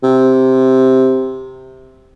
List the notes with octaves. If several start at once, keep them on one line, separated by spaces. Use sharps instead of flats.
C3